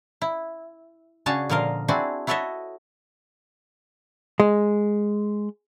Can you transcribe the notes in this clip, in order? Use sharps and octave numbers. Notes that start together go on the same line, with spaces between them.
E4
C#3 D4 F#4 G#4 C#5 A5
A#2 D3 F3 A#4 D#5 F5
C4 D4 E4 F#4 G#4
E4 F#4 A4 C#5 D#5 E5
G#3